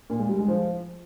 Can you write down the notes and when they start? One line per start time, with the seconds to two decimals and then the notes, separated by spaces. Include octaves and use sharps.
0.10 A#2
0.19 G#3
0.29 G3
0.39 G#3
0.48 F3